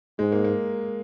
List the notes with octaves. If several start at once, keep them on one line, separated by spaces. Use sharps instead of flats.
G#2 G#3
A#3
A#3